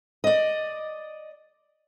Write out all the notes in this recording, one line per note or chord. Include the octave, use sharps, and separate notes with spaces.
D5 D#5